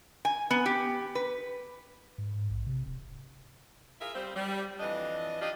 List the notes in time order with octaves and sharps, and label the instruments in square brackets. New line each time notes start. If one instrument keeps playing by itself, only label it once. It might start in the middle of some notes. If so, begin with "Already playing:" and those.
[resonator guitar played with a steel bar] G#5
B3
G4
B4
[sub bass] G#2
A#1
C3
D1
[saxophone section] F4 G#4 A#4 E5
G3 C4
G3
F2 E3 D4 D#5
F3 D4 F4 G4 D#5